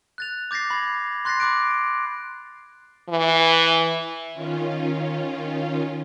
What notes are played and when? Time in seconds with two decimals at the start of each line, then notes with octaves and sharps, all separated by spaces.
0.18 F#6 A6 F7
0.51 D6 G6 A6 A#6 C7
0.70 B5 G#6
1.25 C6 F#6 A6 A#6 C7
1.40 B5 D6 F#6 D7
3.10 E3
4.34 D#3 C#4 F4